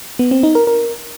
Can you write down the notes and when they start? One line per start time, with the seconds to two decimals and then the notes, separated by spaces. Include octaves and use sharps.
0.19 B3
0.31 C4
0.43 D#4
0.55 A#4
0.67 A#4